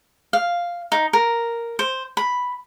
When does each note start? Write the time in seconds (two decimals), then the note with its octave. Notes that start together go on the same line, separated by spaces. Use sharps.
0.33 F5
0.92 D#4
1.13 A#4
1.79 C5
2.17 B5